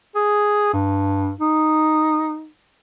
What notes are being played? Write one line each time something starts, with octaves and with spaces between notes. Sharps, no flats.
G#4
G2
D#4